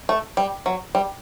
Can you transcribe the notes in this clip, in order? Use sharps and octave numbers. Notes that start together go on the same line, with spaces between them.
A3
G3
F#3
G3